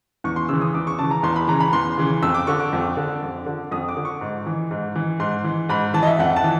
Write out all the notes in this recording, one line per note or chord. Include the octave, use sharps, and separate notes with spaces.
E2 C#6
C6
C#3 E3 E6
D#6
E2 D6
C#6
C#3 E3 A5
A#5
E2 C6
B5
C#3 E3 A#5
B5
E2 C6
C#3 E3
F2 E6
D6
D3 C#6
D6
F2
D3
F2
D3
F2 D#6
D6
D3
C#6
G#2
E3
G#2
E3
G#2 C6
E3
G#2 B5
E3 A5
D#5
E5
F2 F#5
A5
E3